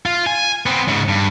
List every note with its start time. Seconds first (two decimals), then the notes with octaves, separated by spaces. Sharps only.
0.06 F4
0.26 G#5
0.66 B3 C4
0.88 G#2 C#3
1.09 G2